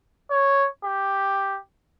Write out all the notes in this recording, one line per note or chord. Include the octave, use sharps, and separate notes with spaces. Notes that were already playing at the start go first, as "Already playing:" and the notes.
C#5
G4